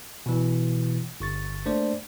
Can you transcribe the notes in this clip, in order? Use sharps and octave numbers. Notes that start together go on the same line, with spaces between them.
B2 E3
G1 C#6 A6
A3 A#3 D4 C5 D5